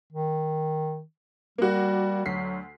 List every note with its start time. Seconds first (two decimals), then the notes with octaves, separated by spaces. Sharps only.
0.13 D#3
1.58 G3 A#3 F#4
2.26 D2 F#3 B6 C7